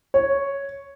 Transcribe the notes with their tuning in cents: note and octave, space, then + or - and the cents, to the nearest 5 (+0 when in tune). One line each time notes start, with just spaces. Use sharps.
C#5 +0